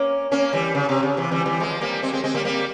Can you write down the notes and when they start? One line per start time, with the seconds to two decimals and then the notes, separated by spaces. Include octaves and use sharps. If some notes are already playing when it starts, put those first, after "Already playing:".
Already playing: A#3 C#4
0.32 A#3 C#4
0.53 E3 G3
0.75 C#3
0.89 C3
1.03 C#3
1.17 C3 E3
1.32 E3 G3
1.46 E3 G3
1.60 F3 G#3
1.81 G3 A#3
2.02 G#3 C4
2.13 G#3 C4
2.24 G#3 C4
2.35 G3 A#3
2.45 G3 A#3